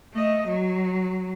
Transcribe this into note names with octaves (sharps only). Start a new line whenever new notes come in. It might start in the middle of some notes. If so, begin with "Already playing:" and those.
A3 D#5
F#3